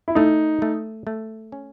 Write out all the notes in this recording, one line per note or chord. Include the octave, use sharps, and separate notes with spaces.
E4
A3 D#4
A3
A3
C#4